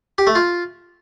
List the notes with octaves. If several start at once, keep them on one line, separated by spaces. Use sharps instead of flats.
G4
A3
F4